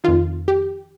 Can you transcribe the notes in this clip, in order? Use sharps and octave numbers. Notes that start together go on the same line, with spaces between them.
F2 D#3 F4
G4